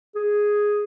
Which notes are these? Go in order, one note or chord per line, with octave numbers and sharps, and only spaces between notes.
G#4